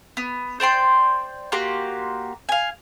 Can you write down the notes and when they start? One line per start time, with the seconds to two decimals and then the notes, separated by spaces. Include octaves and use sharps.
0.17 B3
0.60 C5 D5 G5 C6
1.52 A#3 F#4 G4 C6
2.49 F5 G#5